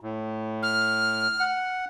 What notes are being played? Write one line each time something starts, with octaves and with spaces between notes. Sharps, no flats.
A2
F6
F#5